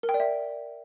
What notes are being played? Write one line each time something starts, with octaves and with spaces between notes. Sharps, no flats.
A#4
G5
D5
E5